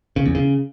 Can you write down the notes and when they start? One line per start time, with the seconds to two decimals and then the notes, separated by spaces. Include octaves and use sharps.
0.16 C#3
0.26 E2
0.35 C#3